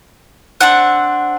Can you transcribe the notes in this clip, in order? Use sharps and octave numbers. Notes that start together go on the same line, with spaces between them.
C4 D4 F#5